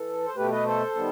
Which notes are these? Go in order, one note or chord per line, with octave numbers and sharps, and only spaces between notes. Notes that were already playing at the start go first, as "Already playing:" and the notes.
Already playing: E3 A4
C5
B2 A3 G4 B4
B4 D#5
A4 C5
D#3 G3 B3